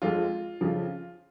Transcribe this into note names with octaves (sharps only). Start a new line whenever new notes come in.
F2 F3 G#3 F4
F2 C#3 F3